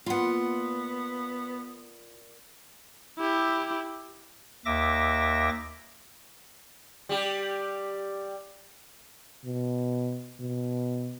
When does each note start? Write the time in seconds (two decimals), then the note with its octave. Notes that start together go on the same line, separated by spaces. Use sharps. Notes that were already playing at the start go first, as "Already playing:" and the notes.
0.06 A#2 B3 F4 F#5 B5
3.18 E4 G4
4.65 D#2 E5 D6 A#6
7.09 G3 G4
9.45 B2
10.40 B2